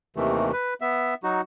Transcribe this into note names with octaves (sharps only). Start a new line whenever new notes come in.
D#2 C3 D#3 E3 A3
B4
B3 E5
F#3 D#4 F#4